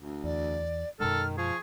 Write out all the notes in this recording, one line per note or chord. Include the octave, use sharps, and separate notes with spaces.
D2
E2 D5
F#2 B2 D#3 G#3 A4 F6
F3 G#4 C#6